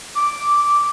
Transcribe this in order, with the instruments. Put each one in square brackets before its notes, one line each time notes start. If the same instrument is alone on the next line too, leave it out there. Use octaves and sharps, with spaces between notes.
[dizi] D6